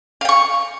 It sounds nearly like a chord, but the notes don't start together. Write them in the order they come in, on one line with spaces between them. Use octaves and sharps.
F5 G5 C#6